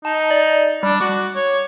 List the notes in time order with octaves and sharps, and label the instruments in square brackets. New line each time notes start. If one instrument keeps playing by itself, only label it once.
[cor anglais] D#4 [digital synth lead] A5
[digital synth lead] D5
[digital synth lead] G3 [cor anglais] D4
[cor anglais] F#4 [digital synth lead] D6
[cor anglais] C#5